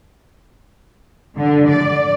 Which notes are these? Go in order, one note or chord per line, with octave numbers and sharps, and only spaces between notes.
D3
D5